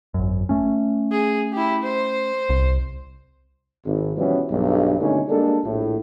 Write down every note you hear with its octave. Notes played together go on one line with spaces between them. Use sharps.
G#1 F#2
A3 C#4
G#4
E4 G4
C5
C2
G#1
B2 E3 F3 G3 B3 C#4
B1 G2
G#1 B2 D3 A3 C#4 D#4
G3 G#3 A#3 D4 A4
A#1 A2